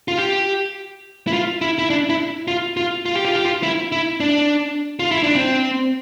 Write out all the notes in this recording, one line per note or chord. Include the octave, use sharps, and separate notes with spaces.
F4
G4
E4
F4
E4
E4
D4
E4
F4
F4
F4
G4
F4
G4
F4
E4
E4
D4
F4
E4
D4
C4